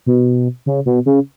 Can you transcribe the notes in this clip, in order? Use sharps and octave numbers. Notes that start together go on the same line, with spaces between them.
B2
C#3
B2
C#3